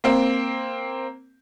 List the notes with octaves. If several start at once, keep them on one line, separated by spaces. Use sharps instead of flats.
A#3 C4